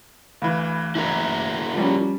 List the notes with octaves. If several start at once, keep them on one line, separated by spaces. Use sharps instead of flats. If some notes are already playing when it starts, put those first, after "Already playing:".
D2 E3 F5 B5
E4 F#4 A#4
F3 G3 C#4